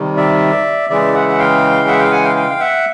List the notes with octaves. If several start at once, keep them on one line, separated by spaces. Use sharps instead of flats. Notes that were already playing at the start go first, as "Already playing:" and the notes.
Already playing: C3 D#3 G3
D5 E5
C#3 E3 G#3 D5 E5
E5 F#5
F#5
F5 G5
E5 F#5
F5 G5
F#5 G#5
F5 G5
F5 G5
F5
E5 F#5